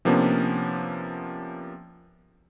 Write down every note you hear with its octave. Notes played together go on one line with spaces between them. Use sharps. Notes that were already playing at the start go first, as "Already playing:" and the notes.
C3 F3 A#3 B3 C#4 D4